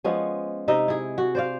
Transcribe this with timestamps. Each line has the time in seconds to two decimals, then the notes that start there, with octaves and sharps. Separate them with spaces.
0.04 F3 G#3 B3 C#4
0.68 C3 D#4 D#5 E5
0.88 E4 G#4
1.18 F#4
1.35 C5 D5 F5